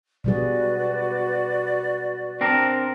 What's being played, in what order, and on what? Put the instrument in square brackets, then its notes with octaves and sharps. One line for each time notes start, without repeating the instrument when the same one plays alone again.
[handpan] B2 G3 G#4 [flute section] F#4 B4 D5
[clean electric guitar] C4 D4 A#4